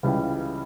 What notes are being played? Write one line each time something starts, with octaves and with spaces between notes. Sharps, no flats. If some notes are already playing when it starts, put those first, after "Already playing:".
C#2 C#3 E3 G3